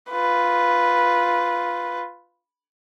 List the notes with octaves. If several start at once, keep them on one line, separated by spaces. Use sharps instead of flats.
F4 B4